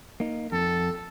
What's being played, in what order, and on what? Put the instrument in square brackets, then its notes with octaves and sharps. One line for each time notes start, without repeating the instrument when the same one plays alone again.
[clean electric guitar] A#3 D#4
[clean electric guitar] F2 [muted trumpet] A4